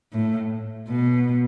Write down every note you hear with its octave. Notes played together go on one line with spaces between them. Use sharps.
A2
B2